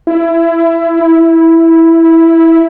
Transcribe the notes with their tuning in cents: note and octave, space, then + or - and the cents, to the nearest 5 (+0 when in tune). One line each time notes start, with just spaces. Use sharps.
E4 +20
E4 -5